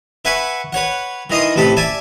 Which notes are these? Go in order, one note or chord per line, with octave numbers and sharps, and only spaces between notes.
B4 E5 F#5 G#5 C#6
B4 C#5 F#5
D#3 E3 D#5 C6 D#6
A1 C3 A4 B4 B5
D5 E5 G#5 A5